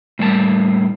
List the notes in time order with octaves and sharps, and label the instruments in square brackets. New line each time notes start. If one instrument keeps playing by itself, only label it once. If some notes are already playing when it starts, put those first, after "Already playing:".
[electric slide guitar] A2 G3 A#3 F#5 A5